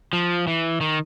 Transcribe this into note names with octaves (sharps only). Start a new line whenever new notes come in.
F3
E3
D#3